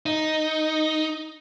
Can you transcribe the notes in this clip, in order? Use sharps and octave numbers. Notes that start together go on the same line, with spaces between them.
D#4